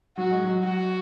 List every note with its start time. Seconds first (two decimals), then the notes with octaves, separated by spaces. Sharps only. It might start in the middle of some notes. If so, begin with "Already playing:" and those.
0.17 F#3 F#4
0.31 G#3
0.44 F#3
0.64 F#4